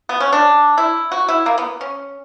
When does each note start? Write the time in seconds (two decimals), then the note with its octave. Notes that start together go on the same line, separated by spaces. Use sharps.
0.09 B3
0.20 C#4
0.33 D4
0.78 E4
1.12 F#4
1.28 E4
1.46 A#3
1.58 B3
1.81 C#4